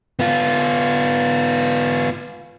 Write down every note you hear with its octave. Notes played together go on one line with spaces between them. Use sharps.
B3 F4